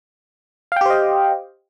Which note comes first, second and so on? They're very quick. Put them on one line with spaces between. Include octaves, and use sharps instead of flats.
F5 G5 G4 C5 D#5